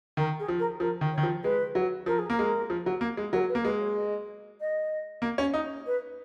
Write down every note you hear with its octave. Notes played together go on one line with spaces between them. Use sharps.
D#3 A#4
G#4
F3
A#4
F3 A#4
D#3
C#5
D#3
F3
G#3 B4
F#3
F3 A#4
G#4
A#3 A#4
G#3
F3
F#3
A#3
G#3
F#3 A#4
B4
A#3
G#3 B4
C#5
D#5
D#5
A#3
C#4
D#4
B4